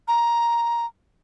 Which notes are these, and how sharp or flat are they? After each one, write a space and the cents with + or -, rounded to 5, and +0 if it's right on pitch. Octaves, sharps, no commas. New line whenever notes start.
A#5 +10